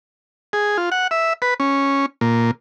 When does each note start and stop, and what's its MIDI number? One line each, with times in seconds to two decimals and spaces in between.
0.53 0.77 68
0.78 0.90 65
0.92 1.07 78
1.11 1.33 76
1.42 1.54 71
1.60 2.06 61
2.21 2.51 46